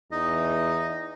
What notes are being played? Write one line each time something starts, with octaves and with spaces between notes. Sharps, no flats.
E2 D#4 D#5